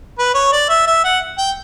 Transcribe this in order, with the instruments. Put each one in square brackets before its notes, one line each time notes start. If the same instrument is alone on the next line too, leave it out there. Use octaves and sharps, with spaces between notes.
[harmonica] B4
C#5
D5
E5
E5
F#5
G5